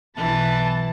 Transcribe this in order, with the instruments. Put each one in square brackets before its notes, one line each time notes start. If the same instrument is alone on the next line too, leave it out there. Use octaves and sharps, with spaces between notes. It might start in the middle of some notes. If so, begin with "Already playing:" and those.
[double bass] B1 [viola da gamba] E3 [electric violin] B4 A5